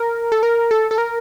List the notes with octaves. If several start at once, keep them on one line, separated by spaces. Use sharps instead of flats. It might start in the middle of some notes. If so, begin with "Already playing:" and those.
Already playing: A#4
A4
A#4
A4
A4
A#4